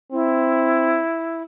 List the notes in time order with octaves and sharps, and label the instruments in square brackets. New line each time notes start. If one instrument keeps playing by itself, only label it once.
[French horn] C4 [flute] E4